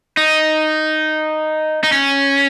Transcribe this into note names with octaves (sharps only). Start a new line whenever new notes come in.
D#4
D#4
C#4